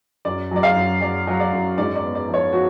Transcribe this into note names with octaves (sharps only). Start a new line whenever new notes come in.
F#2 D5
F#3 D5
F5
F#2
F#3 D5
F#3
D5
F#2
G#2 D5
D5
B3
D5
F3
C#5
F3 F#4